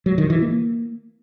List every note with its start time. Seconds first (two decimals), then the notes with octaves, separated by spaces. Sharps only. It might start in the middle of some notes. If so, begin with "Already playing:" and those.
0.06 F#3
0.18 D#3
0.30 E3
0.42 A#3